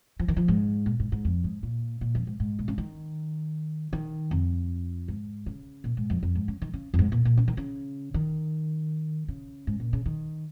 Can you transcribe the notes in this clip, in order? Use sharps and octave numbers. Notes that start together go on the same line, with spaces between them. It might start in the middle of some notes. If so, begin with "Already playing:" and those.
F3
D#3
F3
G#2
A#2
G#2
G#2
F2
G#2
A#2
A#2
F2
G#2
G#2
A#2
C#3
D#3
D#3
F2
G#2
C#3
A#2
G#2
F2
F2
G#2
C#3
D#3
C#3
F2
G#2
A#2
A#2
C#3
D#3
C#3
D#3
C#3
G#2
A#2
C#3
D#3